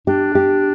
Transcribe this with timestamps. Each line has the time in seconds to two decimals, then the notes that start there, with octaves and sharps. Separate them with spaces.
0.07 D4 G4
0.35 G4